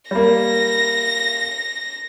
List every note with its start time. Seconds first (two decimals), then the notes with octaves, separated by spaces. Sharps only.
0.11 G3 A#3 A#6